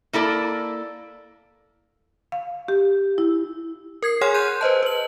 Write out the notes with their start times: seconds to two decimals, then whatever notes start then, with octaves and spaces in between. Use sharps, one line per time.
0.13 A#3 E4 A4 D5
2.32 F5
2.68 G4
3.18 E4
4.02 A#4 G#6 C7
4.21 G#4 C#5 F#5 G#5 C6 F6
4.34 C6 F#6 G6 D#7
4.61 B4 C5 D#5 A5
4.83 B4 F#7